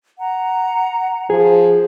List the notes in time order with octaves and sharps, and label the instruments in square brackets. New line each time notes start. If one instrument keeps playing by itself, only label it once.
[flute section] F#5 A#5
[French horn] F3 [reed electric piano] G#4